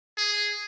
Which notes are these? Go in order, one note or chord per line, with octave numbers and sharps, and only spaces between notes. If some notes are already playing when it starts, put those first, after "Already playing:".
G#4